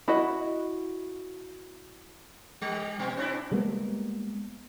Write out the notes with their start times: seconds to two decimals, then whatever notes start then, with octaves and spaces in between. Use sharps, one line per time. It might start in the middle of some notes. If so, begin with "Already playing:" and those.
0.08 E4 F#4 D#5
2.61 G3 G4
2.99 B2 B3 C#4
3.17 C4 D4 E4
3.51 G3 G#3 A#3 B3